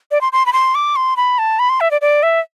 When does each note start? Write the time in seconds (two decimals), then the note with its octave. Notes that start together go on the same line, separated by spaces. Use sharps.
0.11 D5
0.21 C6
0.33 C6
0.46 B5
0.53 C6
0.75 D6
0.96 C6
1.17 B5
1.39 A5
1.59 B5
1.69 C6
1.81 E5
1.91 D5
2.01 D5
2.23 E5